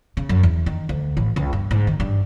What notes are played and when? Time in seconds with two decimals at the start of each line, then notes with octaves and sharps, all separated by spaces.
0.17 C#3
0.29 F#2
0.43 E2
0.66 D#3
0.89 D2
1.17 A1
1.36 C#2
1.53 G2
1.71 G#2
1.87 D#3
2.00 G2